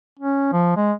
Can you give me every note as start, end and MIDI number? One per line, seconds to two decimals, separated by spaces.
0.19 0.51 61
0.52 0.73 53
0.76 0.92 56